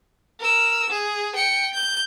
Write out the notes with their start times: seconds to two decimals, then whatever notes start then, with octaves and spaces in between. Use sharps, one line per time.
0.40 A#4 E6
0.90 G#4
1.36 G5 C#7
1.74 G6